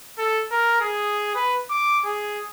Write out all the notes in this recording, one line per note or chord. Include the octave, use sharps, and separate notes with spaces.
A4
A#4
G#4
B4
D6
G#4